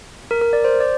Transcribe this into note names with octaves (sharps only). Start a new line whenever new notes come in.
A#4
A#4
D5
C5
D5